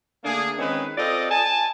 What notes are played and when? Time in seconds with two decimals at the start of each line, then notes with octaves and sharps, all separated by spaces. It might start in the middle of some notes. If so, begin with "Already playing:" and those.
0.25 D3 A3 A#3 D4 G#4
0.59 D#3 G#3 C4 C#4 G#4 B4
0.98 C4 F4 A4 D5 D#5
1.31 G#5 A5